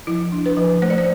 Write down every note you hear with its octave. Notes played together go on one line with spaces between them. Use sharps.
F3 E4
D4
B4
F3
A3 C5
D5
C5